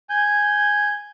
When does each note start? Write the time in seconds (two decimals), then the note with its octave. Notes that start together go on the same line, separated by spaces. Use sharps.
0.10 G#5 G6